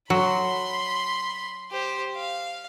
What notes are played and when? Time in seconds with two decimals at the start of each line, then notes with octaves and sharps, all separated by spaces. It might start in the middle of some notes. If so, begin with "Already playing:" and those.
0.10 F#3 B5 C6
1.71 G4 C5
2.15 F5